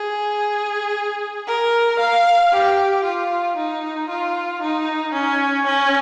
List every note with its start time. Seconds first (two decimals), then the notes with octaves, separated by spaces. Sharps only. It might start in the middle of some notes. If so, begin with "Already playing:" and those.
Already playing: G#4
1.47 A#4
1.99 F5
2.52 G4
3.04 F4
3.56 D#4
4.09 F4
4.62 D#4
5.14 C#4
5.66 C#4